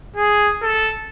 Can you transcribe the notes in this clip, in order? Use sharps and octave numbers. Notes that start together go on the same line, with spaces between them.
G#4
A4